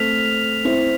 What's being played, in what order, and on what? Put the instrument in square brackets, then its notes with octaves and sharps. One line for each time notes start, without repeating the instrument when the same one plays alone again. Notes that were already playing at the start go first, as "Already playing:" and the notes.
Already playing: [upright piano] A3 C4 [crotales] F6 B6 F7
[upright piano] C4 E4